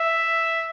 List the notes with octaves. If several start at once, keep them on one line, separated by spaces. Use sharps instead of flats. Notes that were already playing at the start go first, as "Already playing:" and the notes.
Already playing: E5